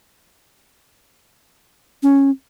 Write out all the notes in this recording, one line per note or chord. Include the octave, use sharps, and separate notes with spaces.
C#4